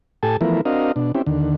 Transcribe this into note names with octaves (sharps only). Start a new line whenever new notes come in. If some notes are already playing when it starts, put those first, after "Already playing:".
A2 G4 A4 G#5 A5
E3 F3 A3 B3 E4 A#4
C4 D4 F#4 A#4 D#5 F5
B2 D4
C4 C#4 E4 G4
D#2 D3